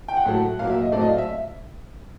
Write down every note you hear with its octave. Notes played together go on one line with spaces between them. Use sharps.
G5
F#5
A2 F#3 A3
A#2 F#3 A#3 F5
E5
D#5
A2 F#3 A3 C4 D5
D#5
F5
E5